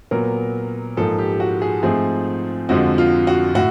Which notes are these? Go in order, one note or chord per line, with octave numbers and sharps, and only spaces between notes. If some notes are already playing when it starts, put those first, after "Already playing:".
A#2 F#3 B3 A#4
G#2 F3 A#3 A4
G4
F#4
G#4
G#2 F3 A3 C4 G#4
F2 D3 F3 G#3 F#4
F4
F#4
A2 F#4